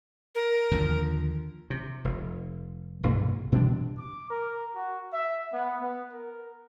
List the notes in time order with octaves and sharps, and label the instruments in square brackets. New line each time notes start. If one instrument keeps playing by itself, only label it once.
[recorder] A#4
[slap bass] D#2 D3 F3
C3
F1
B1 G2 C3 A#3
B2 E3 G3 D4
[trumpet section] D6
A#4
F#4
E5
B3
B3
A#4